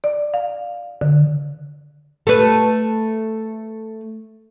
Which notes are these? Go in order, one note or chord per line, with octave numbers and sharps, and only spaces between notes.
D5
F5
D3
A3 B4